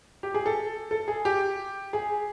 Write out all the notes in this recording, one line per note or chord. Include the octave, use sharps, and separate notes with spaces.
G4
G#4
A4
A4
G#4
G4
G#4